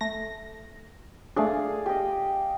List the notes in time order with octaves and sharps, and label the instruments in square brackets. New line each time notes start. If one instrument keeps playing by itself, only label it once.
[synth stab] A3 A#6
[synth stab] A3 D4 [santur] G#4 D5 F5
[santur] G4 D#5